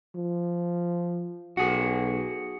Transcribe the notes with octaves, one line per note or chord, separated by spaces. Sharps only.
F3
B1 F#4 G#4